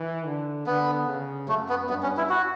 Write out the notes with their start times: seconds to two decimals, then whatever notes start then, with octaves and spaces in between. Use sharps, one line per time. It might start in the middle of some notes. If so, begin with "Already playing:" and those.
Already playing: E3
0.26 D3
0.67 D3 B3
1.08 C#3
1.48 F#2 A3
1.69 B3
1.89 G2 B3
2.03 C#4
2.17 E4
2.30 F#4